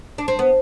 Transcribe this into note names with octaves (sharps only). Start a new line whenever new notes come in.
D4
C4
B3